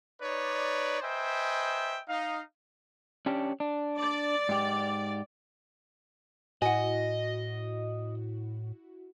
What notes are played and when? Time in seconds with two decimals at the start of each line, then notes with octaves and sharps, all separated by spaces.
0.20 D#4 B4 C#5 D5
1.01 B4 C5 D#5 E5 G5 G#5
2.08 D#4 F5
3.26 C#4 D4 G4
3.60 D4
3.98 D5
4.49 G#2 G4
6.62 A2 E4 F#4 D#5 F#5 G#5